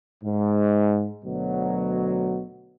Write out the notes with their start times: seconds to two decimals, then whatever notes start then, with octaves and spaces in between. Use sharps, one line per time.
0.23 G#2
1.25 D2 B2 F#3